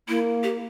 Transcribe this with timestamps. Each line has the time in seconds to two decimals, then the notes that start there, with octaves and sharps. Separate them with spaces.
0.08 A#3 E4
0.43 G4